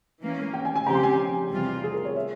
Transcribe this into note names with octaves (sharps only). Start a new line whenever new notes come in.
E3 A#3 C#4
G5
G#5
G#5
C#3 F3 C4 G4 A#5
C6
G#5
G5
E2 C3 G3 C4 F4
G#4
A#4
C#5
E5